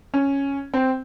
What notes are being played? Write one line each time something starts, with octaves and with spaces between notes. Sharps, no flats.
C#4
C4